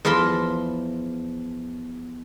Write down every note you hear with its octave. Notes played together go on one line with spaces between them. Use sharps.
E2 F3 A#4 A5 B5 C6